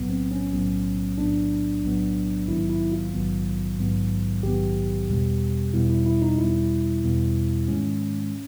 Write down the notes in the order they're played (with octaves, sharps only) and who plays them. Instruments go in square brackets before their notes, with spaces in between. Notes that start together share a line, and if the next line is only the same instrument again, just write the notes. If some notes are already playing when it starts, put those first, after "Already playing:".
Already playing: [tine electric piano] B1 A2 F#3 B3
C4
C#4
B1 A2 F#3 B3
B1 A2 F#3 B3 D4
B1 A2 F#3 B3
A#1 G#2 D#3 F#3 B3 E4
E4
F4
A#1 G#2 D#3 F#3 B3
A#1 G#2 D#3 F#3 B3
A#1 G#2 D#3 F#3 B3 G4
E2 B2 G3 B3
E2 B2 G3 B3 E4
E4
E4
D#4
E2 B2 G3 B3 E4
E2 B2 G3 B3
G#2 D#3 G#3 C#4